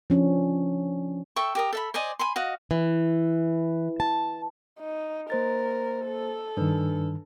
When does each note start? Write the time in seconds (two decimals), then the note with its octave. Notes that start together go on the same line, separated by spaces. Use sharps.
0.10 F3 C#4 D4
1.36 A4 E5 G5 C#6
1.55 G4 A#4 D#6
1.73 A4 E5 B5
1.94 C5 D5 D#5 G#5
2.19 G#5 B5 C6
2.36 F#4 D#5 F5
2.71 E3
4.00 A5
4.80 D#4
5.30 A#3 A#4 C5 A6
6.06 A4
6.57 G2 D#3 D4 B4